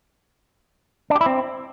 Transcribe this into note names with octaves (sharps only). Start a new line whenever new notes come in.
D4
G4
E4
C4